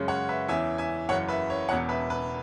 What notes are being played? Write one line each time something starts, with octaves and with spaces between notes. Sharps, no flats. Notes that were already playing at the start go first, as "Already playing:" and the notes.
Already playing: F#2 C#3 G#3 C#4
C#5 F#5
B4 E5
E2 E3 C#4 E5 G#5
E5 G#5
F#1 F#2 C#3 E3 C#5 F#5
B4 E5
C#5
E1 E2 B2 C#5 F#5
B4 E5
B4